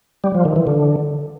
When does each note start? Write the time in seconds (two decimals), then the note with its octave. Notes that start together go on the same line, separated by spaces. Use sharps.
0.24 G3
0.35 F3
0.45 D#3
0.56 E3
0.67 D3